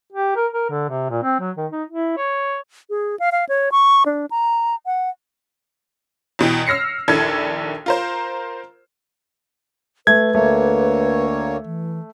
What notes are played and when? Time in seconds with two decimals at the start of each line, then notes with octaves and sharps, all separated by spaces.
0.13 G4
0.36 A#4
0.53 A#4
0.70 D3
0.90 C3
1.10 A#2
1.23 C4
1.40 F#3
1.57 D#3
1.72 D#4
1.88 E4
2.17 C#5
2.90 G#4
3.19 F5
3.32 F5
3.49 C#5
3.72 C#6
4.06 D4
4.31 A#5
4.86 F#5
6.39 E2 B2 E3 G5
6.67 E6 F6 A#6 C7 C#7
7.08 A#1 D#2 D4 E4 A4 G#6
7.86 F4 A#4 C5
10.07 A3 B4 G#6
10.35 D2 A3 A#3 C#5
11.65 E3